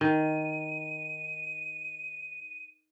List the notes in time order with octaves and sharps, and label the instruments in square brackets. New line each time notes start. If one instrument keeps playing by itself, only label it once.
[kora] D#3 [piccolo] D#7